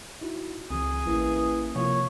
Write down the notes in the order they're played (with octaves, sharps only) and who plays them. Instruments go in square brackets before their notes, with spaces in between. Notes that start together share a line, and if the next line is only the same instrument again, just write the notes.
[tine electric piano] D#4 E4 F#4
[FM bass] C#2 [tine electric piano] E3 C4 [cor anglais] G#4
[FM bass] A1 [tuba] E3 [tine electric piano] A#3 C#4
[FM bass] C3 [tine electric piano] F3 A#3 F4 [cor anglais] C#5